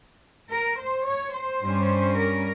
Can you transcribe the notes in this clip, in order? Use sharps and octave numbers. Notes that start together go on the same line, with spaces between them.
A#4
C5
C#5
C5
G2 G3 C#4
A#4